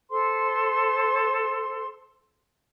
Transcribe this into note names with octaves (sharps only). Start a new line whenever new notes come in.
A4 C5 C6